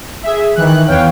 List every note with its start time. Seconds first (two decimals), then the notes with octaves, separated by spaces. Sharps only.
0.23 G#4 E5
0.55 D#3 E3 F#6
0.87 E2 E3 C#5 F5 G5